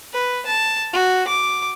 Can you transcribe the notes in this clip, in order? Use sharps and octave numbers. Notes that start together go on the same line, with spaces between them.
B4
A5
F#4
D6